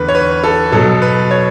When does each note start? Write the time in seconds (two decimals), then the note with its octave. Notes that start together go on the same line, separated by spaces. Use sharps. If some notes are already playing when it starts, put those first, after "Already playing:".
Already playing: E2 D3 B4
0.09 C#5
0.15 B4
0.44 A4
0.72 B2 F#3 A4
1.02 B4
1.31 C#5